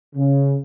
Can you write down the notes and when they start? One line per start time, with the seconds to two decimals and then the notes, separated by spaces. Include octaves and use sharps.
0.15 C#3